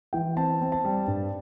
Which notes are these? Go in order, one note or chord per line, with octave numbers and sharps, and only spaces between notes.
E3 G5
C4 A5
C4
A5
G3
G2